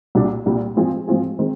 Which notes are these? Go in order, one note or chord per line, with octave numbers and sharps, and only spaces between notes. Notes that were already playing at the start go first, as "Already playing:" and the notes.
C2 A#2 G3 D4
C2 A#2 G3 D4
G#2 F3 C4 F4 G#4
G#2 F3 C4 F4 G#4
D#3 G#3 C4